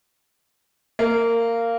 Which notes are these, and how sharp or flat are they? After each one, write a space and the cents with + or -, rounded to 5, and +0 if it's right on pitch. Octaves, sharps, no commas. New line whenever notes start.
A#3 -15